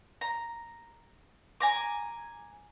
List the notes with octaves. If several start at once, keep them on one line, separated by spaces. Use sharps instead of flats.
A#5
G#5 A#5 D6